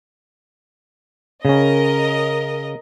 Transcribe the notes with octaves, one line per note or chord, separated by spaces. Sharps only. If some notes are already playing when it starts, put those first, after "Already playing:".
C#3 C#4 A#4 D#5